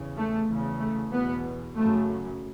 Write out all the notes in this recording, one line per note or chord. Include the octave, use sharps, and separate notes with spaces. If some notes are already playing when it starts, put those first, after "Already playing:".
Already playing: E2 C#3
A3
E2 C#3
A3
E2 B2 B3
F#2 C#3 A3